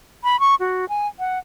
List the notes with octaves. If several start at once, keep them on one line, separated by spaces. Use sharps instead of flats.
B5
C#6
F#4
G#5
F#5